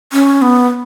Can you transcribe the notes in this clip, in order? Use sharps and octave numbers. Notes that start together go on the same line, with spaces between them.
C#4
B3